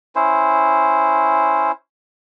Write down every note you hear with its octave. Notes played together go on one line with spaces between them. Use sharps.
C#4 E4 C5